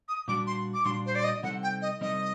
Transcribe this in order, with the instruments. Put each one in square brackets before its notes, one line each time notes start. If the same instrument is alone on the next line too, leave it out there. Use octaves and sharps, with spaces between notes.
[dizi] D#6
[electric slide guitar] A#2 G3 D4 F#4 [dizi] D6
[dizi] C6
D6
[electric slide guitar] A#2 G3 D4 F#4 [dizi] C6
[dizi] C5
D5
D#5
[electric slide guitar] C3 G3 C4 D#4 A4 [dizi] F#5
[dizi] G5
D#5
[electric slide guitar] C3 G3 C4 D#4 A4 [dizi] D#5